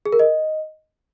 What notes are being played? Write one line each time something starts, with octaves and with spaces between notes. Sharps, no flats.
G#4
A#4
D#5